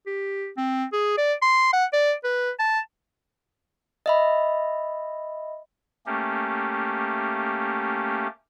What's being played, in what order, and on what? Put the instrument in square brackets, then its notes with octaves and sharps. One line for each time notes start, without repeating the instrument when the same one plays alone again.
[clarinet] G4
C4
G#4
D5
C6
F#5
D5
B4
A5
[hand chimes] D#5 E5 B5
[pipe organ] A3 A#3 C#4 G4